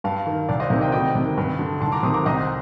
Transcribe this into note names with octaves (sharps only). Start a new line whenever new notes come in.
G2 F5 A5
D#3
C2 D5 F5
C5 D#5
C3 D#3 C5 D#5
D#5 G5
D2 D#5 G5
C3 D#3
G2
D3
C2 A5 C6
A#5 D6
C3 D#3 C6 D#6
A#5 D6
C2 C5 D#5